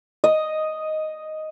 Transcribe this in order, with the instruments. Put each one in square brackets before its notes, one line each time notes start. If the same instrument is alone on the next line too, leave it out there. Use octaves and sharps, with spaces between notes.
[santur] D#5